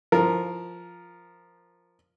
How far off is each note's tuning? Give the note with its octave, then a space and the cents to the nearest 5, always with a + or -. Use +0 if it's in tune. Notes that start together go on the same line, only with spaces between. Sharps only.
F3 +0 A#4 +0